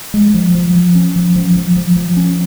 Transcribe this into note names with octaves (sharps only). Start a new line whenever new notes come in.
G#3
F3
F3
F3
C#4
F3
F3
F3
F3
F3
C#4